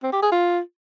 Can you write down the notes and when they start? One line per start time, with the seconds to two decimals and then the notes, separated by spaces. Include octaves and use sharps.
0.03 C4
0.13 G4
0.22 G#4
0.32 F4